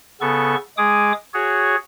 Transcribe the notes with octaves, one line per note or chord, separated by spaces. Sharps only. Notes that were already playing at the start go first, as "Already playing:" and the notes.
C#3 B3 A4 C#6
G#3 G#4 D6 D#6
F#4 G#4 C#5